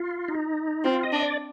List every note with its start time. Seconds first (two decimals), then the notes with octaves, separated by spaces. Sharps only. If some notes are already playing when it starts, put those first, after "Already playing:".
Already playing: F4
0.28 D#4
0.84 C4 F4
1.03 D#5
1.13 D4
1.22 D5